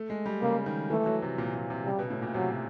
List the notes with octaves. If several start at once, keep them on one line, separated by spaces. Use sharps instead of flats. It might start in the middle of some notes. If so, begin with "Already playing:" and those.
Already playing: A3
G#3
G3
C#3 A#3
D#3
E3 A3
F#3
C3
A#2
A#2
C3
C#3 G3
B2
A2
A#2
C3 F#3